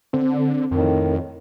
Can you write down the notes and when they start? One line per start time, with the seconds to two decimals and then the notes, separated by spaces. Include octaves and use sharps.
0.13 D3 C4
0.71 F2 A2 D#3